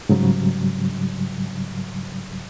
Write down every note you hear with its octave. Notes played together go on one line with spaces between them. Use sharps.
G#2 C#3 F#3 G3